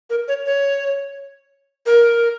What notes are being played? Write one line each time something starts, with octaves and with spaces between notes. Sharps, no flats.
A#4
C#5
C#5
A#4